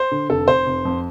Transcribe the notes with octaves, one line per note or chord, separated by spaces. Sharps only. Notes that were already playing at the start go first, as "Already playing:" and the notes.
Already playing: C5
D3
F1 A4
F1 C5
F1
F2